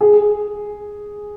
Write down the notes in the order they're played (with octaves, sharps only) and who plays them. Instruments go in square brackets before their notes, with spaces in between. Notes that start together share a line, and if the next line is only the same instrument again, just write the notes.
[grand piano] G#4